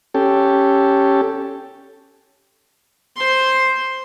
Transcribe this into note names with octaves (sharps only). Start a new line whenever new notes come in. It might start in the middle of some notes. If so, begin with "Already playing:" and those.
C#4 G4 A4
C5 C6